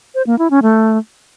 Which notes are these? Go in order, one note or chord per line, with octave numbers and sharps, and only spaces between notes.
C5
A#3
E4
C#4
A3